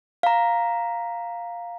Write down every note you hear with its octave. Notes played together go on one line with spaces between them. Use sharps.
F5 A#5